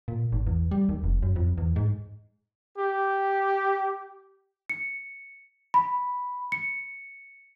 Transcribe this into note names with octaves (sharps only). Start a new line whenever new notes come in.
A#2
G#1
E2
G3
D#2
F1
F#2
F2
E2
G#2
G4
C#7
B5
C#7